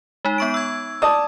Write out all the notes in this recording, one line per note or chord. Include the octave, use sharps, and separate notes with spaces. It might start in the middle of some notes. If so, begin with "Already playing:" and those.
G#3 D#4
B3 C#6 D7
E6 G#6
D5 A5 D#6